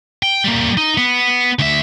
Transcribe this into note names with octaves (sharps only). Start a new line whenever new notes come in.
G5
G3 A#3
D#4
B3
D2 E5